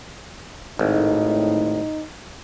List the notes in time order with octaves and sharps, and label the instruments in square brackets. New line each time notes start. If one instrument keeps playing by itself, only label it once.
[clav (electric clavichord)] G#1 [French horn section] A2 [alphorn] D#4